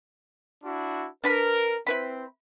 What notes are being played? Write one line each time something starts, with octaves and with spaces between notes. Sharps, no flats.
D4 E4 F#4
D4 A#4 B4 B5
C4 E4 B4 B5